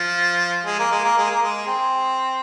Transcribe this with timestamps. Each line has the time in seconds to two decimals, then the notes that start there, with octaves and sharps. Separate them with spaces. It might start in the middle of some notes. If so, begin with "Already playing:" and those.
Already playing: F3
0.66 G#3
0.79 A#3
0.91 G#3
1.04 A#3
1.18 G#3
1.30 A#3
1.43 G#3
1.66 C4